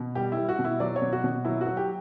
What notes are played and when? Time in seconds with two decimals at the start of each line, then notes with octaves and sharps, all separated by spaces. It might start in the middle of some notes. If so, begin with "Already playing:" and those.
Already playing: B2
0.15 G3 G4
0.32 E4
0.37 G3
0.49 F#4
0.59 B2
0.64 E4
0.80 F#3 D5
0.96 C#5
1.02 B2
1.13 F#4
1.24 B2
1.45 F#3 E4
1.61 F#4
1.67 F#3
1.77 G4